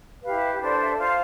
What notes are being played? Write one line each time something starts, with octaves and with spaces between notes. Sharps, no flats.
E4 G4 B4 F5
D4 A4 C5 D5
E5
F4 C5 F5